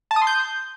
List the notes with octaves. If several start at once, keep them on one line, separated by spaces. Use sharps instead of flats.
A5
D#6
C6
G6